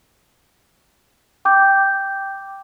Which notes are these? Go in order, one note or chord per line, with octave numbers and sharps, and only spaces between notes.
G5 D6 G6